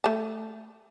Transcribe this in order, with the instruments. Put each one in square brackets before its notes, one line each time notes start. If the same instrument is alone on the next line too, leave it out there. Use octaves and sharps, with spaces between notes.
[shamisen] A3 A5